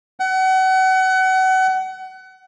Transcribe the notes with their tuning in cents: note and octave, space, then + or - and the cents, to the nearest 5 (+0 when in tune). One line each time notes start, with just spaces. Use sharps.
F#5 +30